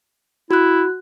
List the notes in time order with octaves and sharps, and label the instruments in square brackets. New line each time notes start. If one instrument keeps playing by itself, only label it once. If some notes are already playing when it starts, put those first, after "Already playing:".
[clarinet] E4 [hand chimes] F#4 F#6